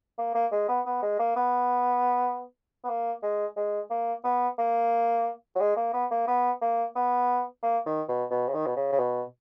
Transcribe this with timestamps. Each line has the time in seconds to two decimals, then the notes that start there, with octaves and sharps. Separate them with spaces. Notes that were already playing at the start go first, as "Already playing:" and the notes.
0.18 A#3
0.35 A#3
0.52 G#3
0.69 B3
0.86 B3
1.03 G#3
1.20 A#3
1.36 B3
2.84 B3
2.89 A#3
3.23 G#3
3.57 G#3
3.90 A#3
4.24 B3
4.58 A#3
5.56 F#3
5.61 G#3
5.77 A#3
5.94 B3
6.11 A#3
6.28 B3
6.62 A#3
6.96 B3
7.63 A#3
7.86 D#3
8.09 B2
8.31 B2
8.48 C#3
8.54 D#3
8.66 B2
8.76 C#3
8.92 C#3
8.99 B2